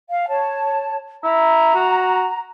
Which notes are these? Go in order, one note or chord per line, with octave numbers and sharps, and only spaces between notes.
F5
C#5 A5
E4 A#5
F#4